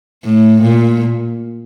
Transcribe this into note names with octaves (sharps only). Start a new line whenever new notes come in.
A2
A#2